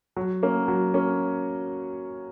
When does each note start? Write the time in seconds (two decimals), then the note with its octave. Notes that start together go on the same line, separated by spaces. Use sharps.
0.16 F#3
0.43 A#3 C#4
0.68 F#3
0.94 A#3 C#4